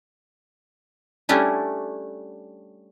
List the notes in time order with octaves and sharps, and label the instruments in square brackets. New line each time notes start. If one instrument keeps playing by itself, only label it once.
[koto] G3 A3 C#4 D4 E4